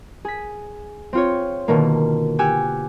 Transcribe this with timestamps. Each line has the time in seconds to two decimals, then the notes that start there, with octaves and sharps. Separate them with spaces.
0.25 G#4 B6
1.13 C4 F4 C#5
1.68 B2 D3 D#3 A#3
2.39 G4 F#5 G#5 E6